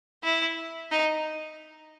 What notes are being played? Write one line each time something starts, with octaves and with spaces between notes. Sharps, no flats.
E4
D#4